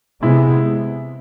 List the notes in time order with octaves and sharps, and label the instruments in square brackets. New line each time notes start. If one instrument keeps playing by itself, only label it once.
[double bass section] C3 G#3 B3 [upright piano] E4